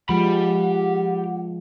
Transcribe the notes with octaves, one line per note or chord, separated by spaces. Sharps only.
F3 G#3 G4 F#5 B5